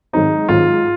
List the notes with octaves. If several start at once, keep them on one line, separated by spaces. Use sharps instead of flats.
G#2 D#3 F#3 C4 D#4
G#2 D#3 F#3 C4 F4